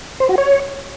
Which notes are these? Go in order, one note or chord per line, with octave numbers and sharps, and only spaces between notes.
C5
F#4
C#5